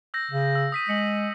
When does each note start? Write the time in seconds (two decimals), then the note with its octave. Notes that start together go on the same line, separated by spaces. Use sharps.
0.14 E6 G6 A#6
0.32 C#3
0.55 E6
0.72 D#6 B6 D#7
0.89 G#3 C#7 F#7